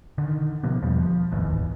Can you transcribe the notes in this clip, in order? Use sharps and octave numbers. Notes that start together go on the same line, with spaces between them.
D3 D#3
B2 F3 A#3 B3
E2 B2 F3 G3
F3
D1 G#1 E2 D#3